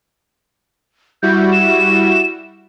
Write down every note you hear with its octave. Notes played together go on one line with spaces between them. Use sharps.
G3 E4 F#4 G6
E7